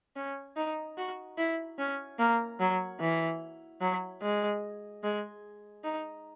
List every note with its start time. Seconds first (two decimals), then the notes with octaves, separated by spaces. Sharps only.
0.16 C#4
0.57 D#4
0.97 F#4
1.38 E4
1.78 C#4
2.19 A#3
2.60 F#3
3.00 E3
3.81 F#3
4.22 G#3
5.03 G#3
5.84 D#4